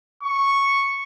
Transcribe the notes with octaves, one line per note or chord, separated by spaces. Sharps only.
C#6